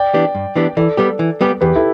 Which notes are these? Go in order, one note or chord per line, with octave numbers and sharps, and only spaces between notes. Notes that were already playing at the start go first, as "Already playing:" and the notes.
Already playing: D5 G5
E3 B3 D4 G4
G2
E3 B3 D4 G4
E3 A4 D5
G3 B3 G4
E3
G3 B3 G4
E2 G4 B4
E4 A4